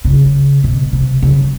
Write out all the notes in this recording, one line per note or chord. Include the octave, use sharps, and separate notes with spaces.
C#3
B2
C3
C#3